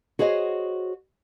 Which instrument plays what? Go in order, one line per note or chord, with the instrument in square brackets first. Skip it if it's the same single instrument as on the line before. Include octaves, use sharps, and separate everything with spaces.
[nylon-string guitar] F#4 G#4 C5 C#5 D#5